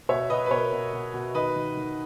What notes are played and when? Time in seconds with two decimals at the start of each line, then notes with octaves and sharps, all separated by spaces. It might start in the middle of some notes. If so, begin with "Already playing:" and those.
0.09 B2 C#5 E5
0.30 B2 B4 D#5
0.46 B4
0.51 B2 A#4 C#5
0.72 B2
0.93 B2
1.14 B2
1.35 D#3 B4 D#5
1.56 D#3
1.77 D#3